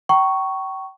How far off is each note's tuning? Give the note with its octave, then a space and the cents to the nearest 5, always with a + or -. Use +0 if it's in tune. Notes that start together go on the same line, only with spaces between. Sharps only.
G5 -35 A#5 +0 C#6 +0